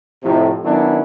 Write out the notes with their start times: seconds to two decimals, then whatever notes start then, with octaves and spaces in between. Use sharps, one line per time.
0.23 F2 A2 C3
0.64 D#3 F#3 B3 C#4 D4 E4